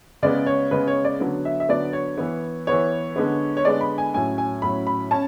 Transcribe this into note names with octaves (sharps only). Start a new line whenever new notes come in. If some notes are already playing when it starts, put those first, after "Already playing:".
C#3 G#3 B3 D5
C#5
C#3 G#3 B3 B4
C#5
D5
D3 F#3 B3
E5
E5
D3 F#3 B3 D5
C#5
E3 B3
E3 B3 C#5
D3 G#3 B3
C#5
D3 G#3 B3 D5
B5
G#5
A2 F#3 C#4 G#5
G#5
A2 F#3 C#4 B5
B5
C#4 A5